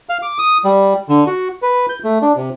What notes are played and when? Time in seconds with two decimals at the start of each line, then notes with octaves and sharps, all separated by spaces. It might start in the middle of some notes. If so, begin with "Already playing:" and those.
0.09 F5
0.22 D6
0.39 D#6
0.64 G3
1.09 D3
1.27 F#4
1.62 B4
1.89 G6
2.04 A3
2.22 D4
2.36 C3